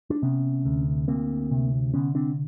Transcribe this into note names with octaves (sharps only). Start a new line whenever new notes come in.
D4
C3 B3 C#4
D2
D2 A#3 C4
C3
D3 B3 C#4
C4 D4